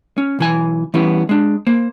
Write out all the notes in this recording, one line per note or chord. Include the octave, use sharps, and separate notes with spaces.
C#4
B1 E3 G#5
E3 G3 B3 C#4 E4
G#3 D4
A#3 C5